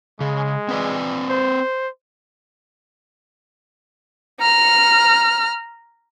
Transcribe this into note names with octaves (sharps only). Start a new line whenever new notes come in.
C#3 G#3
C4 B4 D5
C5
A#5 F6